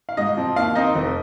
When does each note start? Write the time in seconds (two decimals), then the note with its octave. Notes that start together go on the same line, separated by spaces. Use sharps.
0.09 F5
0.17 G#2 D#5
0.37 F3 C4
0.56 D#2 F5
0.75 D#3 C4 D#4 D#5
0.95 F1